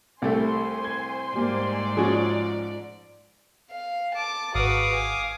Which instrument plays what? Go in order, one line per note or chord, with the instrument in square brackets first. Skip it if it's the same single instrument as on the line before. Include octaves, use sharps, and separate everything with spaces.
[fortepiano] C2 G3 A3 [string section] C5 G#5 C6
[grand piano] G#6
[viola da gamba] G#2 D5 [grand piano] G3 A#3 G4
[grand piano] F3 [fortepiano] C#4 F#4 G#4
[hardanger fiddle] F5
A5 D6
[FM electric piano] G#1 [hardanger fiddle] F#4 B4 [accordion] F5 D6 D#6
[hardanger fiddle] G#5